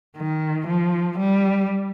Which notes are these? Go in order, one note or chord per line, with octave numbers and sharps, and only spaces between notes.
D#3
F3
G3